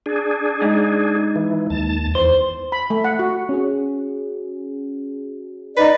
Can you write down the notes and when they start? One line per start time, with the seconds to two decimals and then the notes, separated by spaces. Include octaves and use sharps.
0.06 D4 G#4
0.62 G#2
1.36 E3
1.70 D#2 A5
2.15 E2 C5
2.72 B5
2.90 A3
3.04 F#5
3.19 F#4
3.49 C#4 F#4 G#4
5.77 D#4 B4 D5 D#5